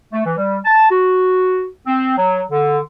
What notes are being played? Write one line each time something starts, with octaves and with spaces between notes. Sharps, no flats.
A3
E3
G3
A5
F#4
C4
F#3
D3